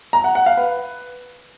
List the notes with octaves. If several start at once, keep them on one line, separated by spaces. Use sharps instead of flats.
A#5
F#5
F#5
F5
B4